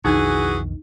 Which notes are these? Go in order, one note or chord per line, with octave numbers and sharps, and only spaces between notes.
B1 F2 D#3 E3 D4 D#4 F#4 G#4